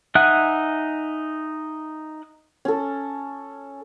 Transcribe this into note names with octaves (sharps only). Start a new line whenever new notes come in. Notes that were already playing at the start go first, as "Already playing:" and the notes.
D#4 E5 F#5 G#5 F#6
C#4 A4